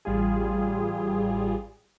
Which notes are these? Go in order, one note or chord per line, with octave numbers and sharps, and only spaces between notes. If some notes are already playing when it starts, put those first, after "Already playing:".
A1 G3 F4 G#4